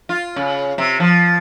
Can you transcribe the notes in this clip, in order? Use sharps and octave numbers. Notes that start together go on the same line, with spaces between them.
F4
C#3
C3
F3